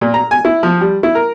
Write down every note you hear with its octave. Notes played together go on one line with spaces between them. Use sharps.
A#2
A#5
G#5
E4
F3
G3
E4
A#4